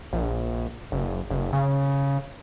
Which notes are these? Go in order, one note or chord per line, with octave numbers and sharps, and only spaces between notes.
A#1
F#1
F#1
C#3